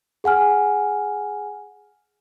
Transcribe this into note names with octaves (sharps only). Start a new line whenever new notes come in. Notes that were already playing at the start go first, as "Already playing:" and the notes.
G#4 F#5 G#5 F6